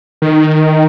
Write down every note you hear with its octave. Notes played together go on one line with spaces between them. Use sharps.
D#3